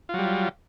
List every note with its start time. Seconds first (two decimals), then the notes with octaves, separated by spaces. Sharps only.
0.09 F4
0.14 F#3
0.18 G3